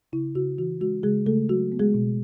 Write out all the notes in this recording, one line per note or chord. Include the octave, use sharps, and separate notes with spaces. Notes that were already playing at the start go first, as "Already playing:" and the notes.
C#3 E4
C#3 F#4
E3 F#4
G#3 F#4
C#3 G#3 G#4
C#3 A3 A4
F#3 F#4
B3
G#3 G#4
B2